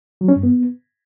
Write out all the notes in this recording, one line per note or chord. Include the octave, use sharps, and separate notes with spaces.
F#3
C#4
G2
B3